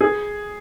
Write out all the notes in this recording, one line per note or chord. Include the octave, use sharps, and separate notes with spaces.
G#4